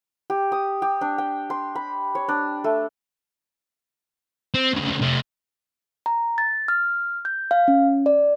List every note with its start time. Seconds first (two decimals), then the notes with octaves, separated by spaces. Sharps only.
0.30 G4
0.52 D#6
0.82 G4
1.01 D4
1.18 G5
1.50 C6
1.75 B5
2.15 C#5
2.28 D4
2.64 A3
4.54 C4
4.74 D2 C#3
5.02 C3 A3
6.06 A#5
6.38 A6
6.68 F6
7.25 G6
7.51 F5
7.68 C#4
8.06 D5